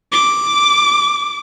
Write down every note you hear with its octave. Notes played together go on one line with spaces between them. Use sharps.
D6